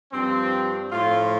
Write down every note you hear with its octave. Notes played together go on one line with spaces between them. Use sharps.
G2 F3 C4
A2 F3 F4